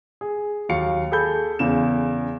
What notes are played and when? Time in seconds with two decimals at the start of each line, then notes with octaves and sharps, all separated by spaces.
0.21 G#4
0.69 D#2 F#3 F5 C#7
1.12 G#4 A4 B5 G6
1.59 E2 C#3 E7